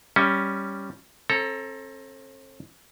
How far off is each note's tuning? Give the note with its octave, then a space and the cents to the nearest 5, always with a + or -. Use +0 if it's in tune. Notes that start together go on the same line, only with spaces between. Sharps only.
G3 +0 C#4 +0 D#5 +40
C4 +40 A4 +0 A#5 +0